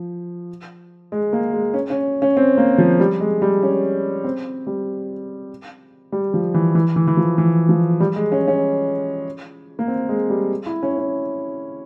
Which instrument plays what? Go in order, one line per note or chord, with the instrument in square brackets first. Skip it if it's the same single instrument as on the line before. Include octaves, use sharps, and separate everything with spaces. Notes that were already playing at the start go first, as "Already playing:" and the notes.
Already playing: [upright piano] F3
G#3
A#3
G#3
C#4
C#4
C#4
C4
A#3
F3
G3
G#3
G3
C#4
C4
G3
G3
F3
E3
E3
E3
E3
F3
E3
F3
G3
G#3
C#4
C#4
A#3
C4
G#3
G3
E4
C#4
C#4